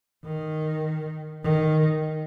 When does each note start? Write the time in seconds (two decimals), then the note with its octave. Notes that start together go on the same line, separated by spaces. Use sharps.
0.25 D#3
1.44 D#3